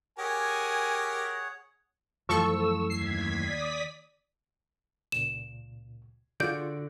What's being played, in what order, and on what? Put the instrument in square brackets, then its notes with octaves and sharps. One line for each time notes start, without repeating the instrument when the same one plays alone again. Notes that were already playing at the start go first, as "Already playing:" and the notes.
[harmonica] G4 A#4 [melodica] G#4 C#5 F#5 [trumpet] G#5
[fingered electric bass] F#2 E3 A3 [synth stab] F3 A4 C#6 [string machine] E6
[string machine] D#2 G#6 B6 [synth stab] C7
[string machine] D5 D#6 B6
[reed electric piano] C#2 A#2 [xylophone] E7
[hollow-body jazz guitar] D3 F#4 D5 [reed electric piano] F4 G#4 [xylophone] G6